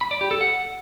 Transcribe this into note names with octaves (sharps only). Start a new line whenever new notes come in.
B5
D5
G4
A4
F#5